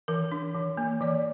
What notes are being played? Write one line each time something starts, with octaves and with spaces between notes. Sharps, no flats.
E3 A#4
D4
E3
A#3
E3 D5